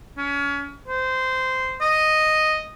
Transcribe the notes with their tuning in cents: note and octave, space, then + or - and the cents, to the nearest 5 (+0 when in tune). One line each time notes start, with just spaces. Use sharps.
C#4 +30
C5 -15
D#5 -5